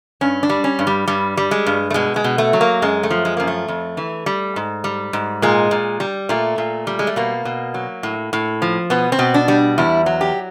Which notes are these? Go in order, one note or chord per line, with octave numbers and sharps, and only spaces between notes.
G2 C#4
D4
G3
C#4
G2
G3
G2 G3
G3
G#3
G2
A3
B2 G#3
G#3
B2
A3
F#3
A#3
F#2 G#3
A3
F3
G#3
F#2 A#3
A3
F2
E3
G3
G#2
G3
G#2
A#2 G#3
A#2
G3
A#2 A3
A#2
G3
G#3
A3
B2 A#3
B2
F#3
A2
A2
F3
B2 B3
C4
B2
D4
G3
E2 E4
F#3
G4